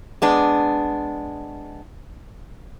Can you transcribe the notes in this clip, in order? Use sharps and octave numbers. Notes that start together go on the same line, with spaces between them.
G#3 B3 D4